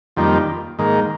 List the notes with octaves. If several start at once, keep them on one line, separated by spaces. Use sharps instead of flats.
F2 D#3 G3 A#3
G#2 D#3 A#3